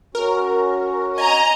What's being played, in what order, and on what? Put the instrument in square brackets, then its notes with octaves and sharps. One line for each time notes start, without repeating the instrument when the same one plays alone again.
[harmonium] C#4 F#4 [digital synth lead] A#4
[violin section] D#5 A#5 [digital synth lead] G#5